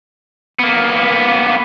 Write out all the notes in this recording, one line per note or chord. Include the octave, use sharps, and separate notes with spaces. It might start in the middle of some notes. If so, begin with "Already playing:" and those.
A#3 B3